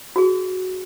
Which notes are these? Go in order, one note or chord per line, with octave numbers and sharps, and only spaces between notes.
F#4 G#4